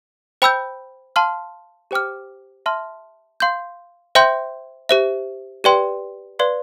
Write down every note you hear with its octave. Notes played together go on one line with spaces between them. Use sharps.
C5 G5 B5 E6 G6
F5 A5 C6 F6
G4 C5 G5 D6 F6
E5 A5 C6 F6
F5 C6 G6
C5 E5 G5 C6 G6
G4 C5 E5
G4 B4 D5 G5 C6
B4 D5 F5 C6